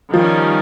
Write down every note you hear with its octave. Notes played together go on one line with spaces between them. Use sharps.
D#3 F3 G3 C#4